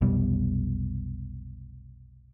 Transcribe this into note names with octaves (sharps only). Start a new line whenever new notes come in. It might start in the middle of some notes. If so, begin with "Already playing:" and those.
F1 B1 B2 G3